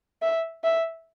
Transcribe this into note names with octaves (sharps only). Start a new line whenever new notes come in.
E5
E5